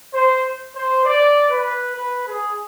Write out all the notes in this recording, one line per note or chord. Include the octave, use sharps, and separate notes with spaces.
C5
C5
D5
B4
B4
G#4